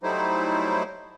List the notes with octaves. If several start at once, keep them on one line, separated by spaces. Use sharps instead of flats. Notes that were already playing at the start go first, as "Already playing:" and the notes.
F#3 G3 A3 D#4 E4 C5